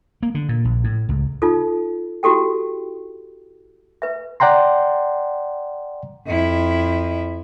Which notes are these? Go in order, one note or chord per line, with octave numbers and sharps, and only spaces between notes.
A#3
D3
A#2
A#1
A2
C#2
D#4 F4 A4
E4 F#4 G4 A4 G5
B4 E5
D5 F#5 G5 A#5 C6
F2 E4